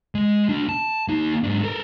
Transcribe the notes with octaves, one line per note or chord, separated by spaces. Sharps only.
G#3
A3 D4
A5
A#3 D#4
G#2 D4
A4 A#4